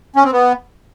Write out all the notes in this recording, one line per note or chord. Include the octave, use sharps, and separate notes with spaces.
C#4
C4
B3